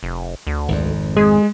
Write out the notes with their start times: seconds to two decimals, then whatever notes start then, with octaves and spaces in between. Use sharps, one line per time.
0.03 F1
0.47 D2
0.68 G#1 F2
1.16 G#3 G#4